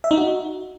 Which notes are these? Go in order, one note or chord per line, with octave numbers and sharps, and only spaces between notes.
E5
D#4
F#4